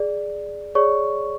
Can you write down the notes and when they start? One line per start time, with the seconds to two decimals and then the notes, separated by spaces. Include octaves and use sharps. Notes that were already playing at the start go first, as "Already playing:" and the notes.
Already playing: G#4 D5
0.75 G#4 C#5 D5 C#6